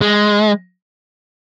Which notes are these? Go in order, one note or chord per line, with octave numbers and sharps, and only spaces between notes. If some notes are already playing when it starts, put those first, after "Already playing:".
G#3